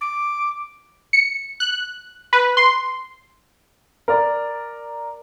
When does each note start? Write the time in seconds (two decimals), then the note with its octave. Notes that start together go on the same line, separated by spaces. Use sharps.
0.01 D6
1.13 C#7
1.60 F#6
2.33 B4
2.57 C6
4.08 A#4 D5